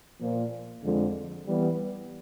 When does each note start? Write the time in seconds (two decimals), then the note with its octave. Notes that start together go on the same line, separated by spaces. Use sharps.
0.19 A#2 F3 A#3
0.83 F2 D3 F3 G#3
1.46 E3 G3 B3